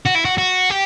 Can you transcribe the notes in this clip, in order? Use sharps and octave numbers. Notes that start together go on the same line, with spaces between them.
F#4
E4
F#4
F#4
G4